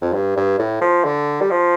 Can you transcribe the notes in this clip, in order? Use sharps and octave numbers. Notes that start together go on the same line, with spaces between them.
F2
G2
G2
A2
F3
D3
G3
F3